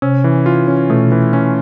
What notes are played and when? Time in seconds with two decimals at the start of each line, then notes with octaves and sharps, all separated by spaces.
0.02 C3 C#4
0.24 E3
0.46 F4
0.68 C#4
0.90 B2 A3
1.12 E3
1.33 C#4